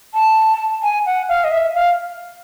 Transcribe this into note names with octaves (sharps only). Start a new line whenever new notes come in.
A5
G#5
F#5
F5
D#5
E5
F5